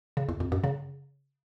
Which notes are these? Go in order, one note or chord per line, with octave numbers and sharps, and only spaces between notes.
C#3
E2
F2
F#2
C#3